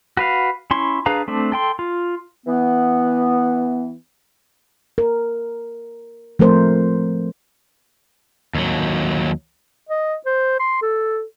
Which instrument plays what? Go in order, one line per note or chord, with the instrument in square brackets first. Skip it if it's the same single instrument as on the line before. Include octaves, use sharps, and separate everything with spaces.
[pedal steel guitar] F#4 B4 F5
C#4 E4 C6 C#6
D4 G#4 B4 F5 A#5
A3 C4 D4
A4 G5 C6
F4
[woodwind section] E3 B3
[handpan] A#4
F3 A3 C4 A#4 C5
[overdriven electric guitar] D#2 F#3
[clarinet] D#5
C5
C6
A4